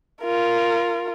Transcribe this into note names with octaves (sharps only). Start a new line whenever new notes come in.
F4 A#4